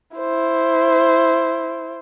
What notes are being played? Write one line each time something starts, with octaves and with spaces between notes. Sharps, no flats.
E4 C5